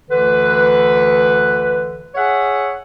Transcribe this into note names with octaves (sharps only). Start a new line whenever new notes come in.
D2 D3 E3 B4
G#4 C#5 E5 F#5